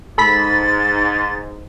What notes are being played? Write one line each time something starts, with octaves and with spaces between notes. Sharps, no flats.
G#2 A4 B5 A6 B6